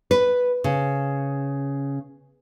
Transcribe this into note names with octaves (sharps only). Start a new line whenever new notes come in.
B4
C#3